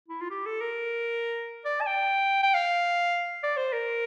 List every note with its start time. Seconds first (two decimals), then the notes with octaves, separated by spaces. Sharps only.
0.08 E4
0.21 F4
0.31 G4
0.46 A4
0.61 A#4
1.65 D5
1.81 A5
1.86 G5
2.43 G5
2.54 F5
3.43 D5
3.57 C5
3.73 A#4